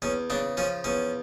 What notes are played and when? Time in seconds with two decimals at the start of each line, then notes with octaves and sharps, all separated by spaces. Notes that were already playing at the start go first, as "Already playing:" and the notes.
0.02 E2 C#4
0.30 C#3 D4
0.57 F3 C#4
0.84 E2 C#4